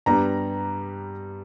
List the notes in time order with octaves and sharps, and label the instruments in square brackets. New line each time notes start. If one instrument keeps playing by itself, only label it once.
[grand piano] G2 G3 B3 A#5